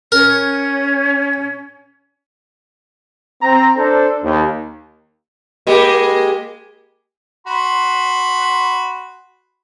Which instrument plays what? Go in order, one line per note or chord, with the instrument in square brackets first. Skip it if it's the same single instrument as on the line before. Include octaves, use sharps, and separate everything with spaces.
[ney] C#4 [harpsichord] A#4
[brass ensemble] C4 A#5
D4 A4 C5
D#2
[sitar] G#3 A#3 G4
[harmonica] F#4 B5 C6